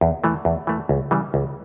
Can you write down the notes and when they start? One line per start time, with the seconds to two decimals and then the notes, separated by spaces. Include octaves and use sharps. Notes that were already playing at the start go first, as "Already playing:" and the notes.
0.01 E2
0.24 E3 A3
0.45 E2
0.67 E3 A3
0.89 C#2
1.11 C#3 E3 G3
1.34 C#2